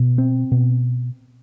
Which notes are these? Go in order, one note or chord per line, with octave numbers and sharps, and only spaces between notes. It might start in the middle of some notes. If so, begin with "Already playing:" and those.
Already playing: B2
C4
B2